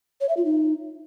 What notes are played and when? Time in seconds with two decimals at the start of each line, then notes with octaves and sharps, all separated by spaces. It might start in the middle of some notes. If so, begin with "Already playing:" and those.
0.21 C#5
0.29 E5
0.37 F4
0.45 D#4